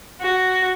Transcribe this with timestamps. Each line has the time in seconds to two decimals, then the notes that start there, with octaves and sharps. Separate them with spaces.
0.21 F#4